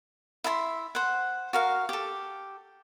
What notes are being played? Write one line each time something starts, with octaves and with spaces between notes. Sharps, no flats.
E4 E5 A5 C6
C5 F#5
F#4 A#4 F5
G4 A4